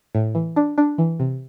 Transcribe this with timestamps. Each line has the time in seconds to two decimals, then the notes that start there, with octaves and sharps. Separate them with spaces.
0.15 A2
0.35 E3
0.56 D4
0.78 D4
0.98 E3
1.20 C3